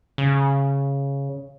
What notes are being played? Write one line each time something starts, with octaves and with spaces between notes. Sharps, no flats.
C#3